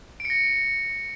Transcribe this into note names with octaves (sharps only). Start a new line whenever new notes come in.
D7
C#7
A#6